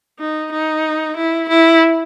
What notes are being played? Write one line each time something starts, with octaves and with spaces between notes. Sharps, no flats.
D#4
D#4
E4
E4